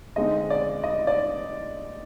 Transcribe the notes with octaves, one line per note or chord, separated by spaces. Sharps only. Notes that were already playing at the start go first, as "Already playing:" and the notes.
D3 G#3 C4 D#4 D#5
D5
D#5
D5